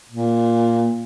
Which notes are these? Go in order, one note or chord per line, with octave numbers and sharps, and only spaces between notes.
A#2